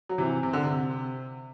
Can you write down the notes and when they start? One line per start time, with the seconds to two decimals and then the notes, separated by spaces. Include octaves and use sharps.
0.09 F#3
0.18 C3 E3
0.43 C3
0.53 D3
0.63 C3